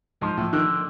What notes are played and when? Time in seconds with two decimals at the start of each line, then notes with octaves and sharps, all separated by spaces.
0.21 G#2 F3
0.37 A2
0.53 D3 D#3